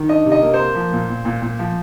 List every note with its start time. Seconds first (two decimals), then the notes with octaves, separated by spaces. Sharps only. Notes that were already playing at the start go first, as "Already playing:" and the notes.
Already playing: D#3
0.09 D4 D#5
0.25 C3
0.32 D#5
0.42 A#3
0.53 C5
0.59 A#3
0.75 F3
0.93 A#2
1.09 A#2
1.25 A#2
1.42 A#2
1.59 F3